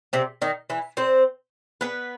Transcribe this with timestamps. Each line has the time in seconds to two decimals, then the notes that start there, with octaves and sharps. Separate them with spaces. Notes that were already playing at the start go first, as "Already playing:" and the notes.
0.13 C3 C4
0.42 D#3 D#4
0.70 E3 E4
0.97 C4 C5
1.81 B3 B4